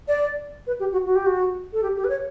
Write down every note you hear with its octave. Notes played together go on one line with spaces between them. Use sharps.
D5
B4
G4
F#4
F#4
G4
F#4
A4
G4
G4
B4
C#5